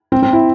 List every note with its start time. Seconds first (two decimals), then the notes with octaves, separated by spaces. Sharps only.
0.12 C4
0.22 C4
0.33 E4